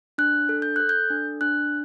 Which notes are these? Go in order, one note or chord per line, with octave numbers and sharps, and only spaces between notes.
D4 F#6
A4
G6
A4 F#6
G6
D4
D4 F#6